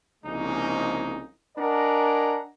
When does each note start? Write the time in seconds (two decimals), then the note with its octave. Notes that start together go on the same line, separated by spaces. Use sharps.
0.24 C2 C#3 F3 G#3 A#3 D#4
1.57 D4 A#4 D#5 F#5 G#5 A#5